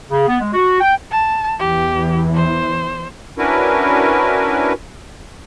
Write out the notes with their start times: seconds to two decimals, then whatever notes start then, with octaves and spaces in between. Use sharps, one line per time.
0.11 C#3
0.28 B3
0.41 G#3
0.54 F#4
0.81 G5
1.11 A5
1.59 E2 E3 G4
2.35 C5
3.38 C#4 D4 E4 F#4 A#4 B4